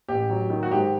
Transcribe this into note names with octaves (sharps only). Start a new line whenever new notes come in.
A1 G4
F#3
D#3
F#4
G#2 G4